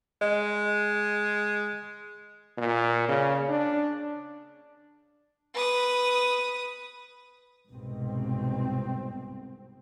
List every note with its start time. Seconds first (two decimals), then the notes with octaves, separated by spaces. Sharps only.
0.21 G#3 D#5
2.58 A#2
3.08 C#3
3.49 D4
5.54 B4 D#6
7.72 C2 G#2 B2 C4